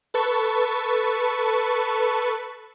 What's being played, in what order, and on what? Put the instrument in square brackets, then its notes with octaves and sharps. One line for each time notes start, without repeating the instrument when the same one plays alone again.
[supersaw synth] A4 B4 A5 C#6